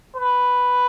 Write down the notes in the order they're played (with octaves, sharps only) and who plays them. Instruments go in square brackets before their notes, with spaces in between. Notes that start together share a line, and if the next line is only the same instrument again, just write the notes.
[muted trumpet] B4